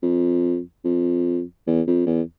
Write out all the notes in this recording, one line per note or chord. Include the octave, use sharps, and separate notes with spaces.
F2
F2
E2
F2
E2